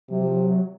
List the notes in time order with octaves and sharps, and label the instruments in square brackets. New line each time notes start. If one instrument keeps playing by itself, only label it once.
[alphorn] C3 [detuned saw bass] F#3
[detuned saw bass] F3
F#3